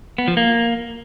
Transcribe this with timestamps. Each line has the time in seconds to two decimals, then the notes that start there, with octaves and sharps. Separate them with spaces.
0.18 B3
0.28 F3
0.37 A#3